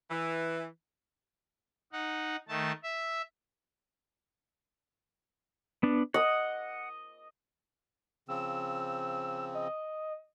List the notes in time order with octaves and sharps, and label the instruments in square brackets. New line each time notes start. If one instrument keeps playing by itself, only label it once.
[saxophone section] E3
[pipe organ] D#4 F#5
D#3 A3 A5
E5
[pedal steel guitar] B3 D4
[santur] D#5 [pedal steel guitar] F#5
[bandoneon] C#3 F3 C4 [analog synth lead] E6
[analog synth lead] D#5